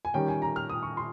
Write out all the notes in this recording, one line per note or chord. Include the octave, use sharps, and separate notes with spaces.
G#5
D#3 G3 C#4 G5
G#5
A#5
F6
D#6
C#6
C6